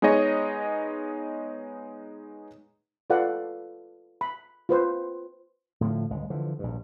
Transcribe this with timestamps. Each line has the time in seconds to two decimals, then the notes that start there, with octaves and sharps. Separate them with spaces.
0.02 G#3 B3 D#4 G#4 C#5 D#5
3.10 F4 A4 B4 D5 F5 F#5
4.21 B5
4.69 F4 B4 C5
5.81 A2 D3 E3 F3
6.10 G1 C#2 G#3
6.30 D3 E3 F3
6.59 A#1 G2